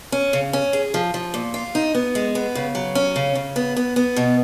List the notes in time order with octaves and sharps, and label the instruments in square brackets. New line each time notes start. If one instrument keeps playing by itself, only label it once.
[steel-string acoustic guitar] C#4
C#3
C#4
G#4
F3
F3
A#2
F4
D#4
B3
G#3
B3
C#3
F#3
C#4
C#3
C#3
B3
B3
B3
B2